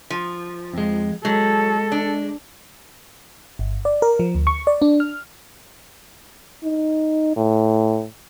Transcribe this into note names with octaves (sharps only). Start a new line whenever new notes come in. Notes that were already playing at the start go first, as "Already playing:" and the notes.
F3
F2 G#3
F#3 G#3 A4
D4
G1
D5
A#4
F3
D2
C#6
D5
D4
F6
D#4
A2